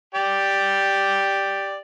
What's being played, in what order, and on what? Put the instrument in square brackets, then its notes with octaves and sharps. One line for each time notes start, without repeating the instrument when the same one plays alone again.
[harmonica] G4 D5